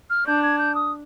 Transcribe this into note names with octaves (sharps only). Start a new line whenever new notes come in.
F6
D4 G6
G#6
G6
D#6